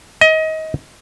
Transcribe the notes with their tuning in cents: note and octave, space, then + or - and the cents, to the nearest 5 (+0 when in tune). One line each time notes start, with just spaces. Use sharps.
D#5 +25